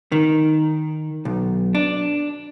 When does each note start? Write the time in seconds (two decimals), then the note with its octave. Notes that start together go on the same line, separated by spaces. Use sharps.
0.12 D#3
1.25 B1
1.75 D4